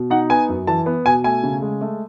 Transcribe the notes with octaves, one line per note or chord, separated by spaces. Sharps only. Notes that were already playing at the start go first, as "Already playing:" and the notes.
Already playing: B2
D#4 F#5
B3 G#5
F#2
E3 A5
B3
B2 G#5
A3 G#5
C#3
G#3
A3